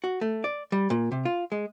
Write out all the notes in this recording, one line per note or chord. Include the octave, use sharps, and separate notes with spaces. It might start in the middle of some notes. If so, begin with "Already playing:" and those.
F#4
A3
D5
G3
A#2
C3
F4
G#3